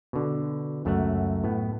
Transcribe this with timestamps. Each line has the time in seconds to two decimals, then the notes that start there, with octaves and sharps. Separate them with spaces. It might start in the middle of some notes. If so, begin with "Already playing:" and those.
0.13 B2 D3
0.85 C#2 F#2 A3 C#5 E5 F#5
1.44 A2 B3